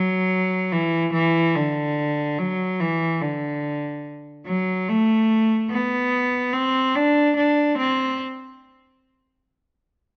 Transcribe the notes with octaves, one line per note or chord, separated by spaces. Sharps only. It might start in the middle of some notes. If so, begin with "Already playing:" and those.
Already playing: F#3
E3
E3
D3
F#3
E3
D3
F#3
A3
B3
C4
D4
D4
C4